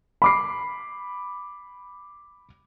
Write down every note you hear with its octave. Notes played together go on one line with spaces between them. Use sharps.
B5 D6 C7